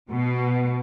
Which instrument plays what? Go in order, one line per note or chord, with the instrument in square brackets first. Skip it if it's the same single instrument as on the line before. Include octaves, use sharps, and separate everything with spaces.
[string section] B2